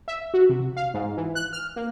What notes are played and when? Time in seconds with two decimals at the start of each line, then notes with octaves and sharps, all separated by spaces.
0.08 E5
0.34 F#4
0.50 C3
0.77 F5
0.94 G#2
1.17 E3
1.35 F#6
1.53 F6
1.76 A#3